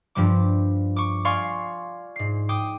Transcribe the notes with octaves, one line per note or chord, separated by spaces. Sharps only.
G2 F3 G3 D6
C#6 D6
D5 F5 G#5 C6 C#6
G#2 C7
G5 D6 D#6